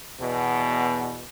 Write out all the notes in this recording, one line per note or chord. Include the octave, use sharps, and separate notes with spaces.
E2 B2